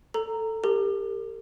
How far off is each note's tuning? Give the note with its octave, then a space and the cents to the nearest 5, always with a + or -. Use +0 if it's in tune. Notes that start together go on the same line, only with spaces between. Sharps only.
A4 +10 A#5 -10
G4 +20 A#4 -40